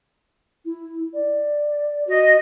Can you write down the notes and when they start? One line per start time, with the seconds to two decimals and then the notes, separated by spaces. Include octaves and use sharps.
0.65 E4
1.14 D5
2.07 F#4 D#5